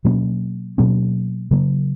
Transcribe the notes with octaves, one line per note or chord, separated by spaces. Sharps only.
B2 F#3 A#3 C#4
B2 F#3 A#3 C#4
C#3 F#3 A#3